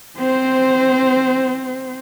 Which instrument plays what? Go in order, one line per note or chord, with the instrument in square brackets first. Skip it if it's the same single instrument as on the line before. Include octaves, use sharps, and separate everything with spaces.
[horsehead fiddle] C4 C5